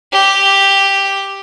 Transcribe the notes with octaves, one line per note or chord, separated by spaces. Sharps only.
G4